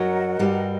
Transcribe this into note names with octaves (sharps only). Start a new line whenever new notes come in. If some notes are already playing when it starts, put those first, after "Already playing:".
Already playing: F#2 F#3 F#4 A#4 D#5 F#5
G2 G3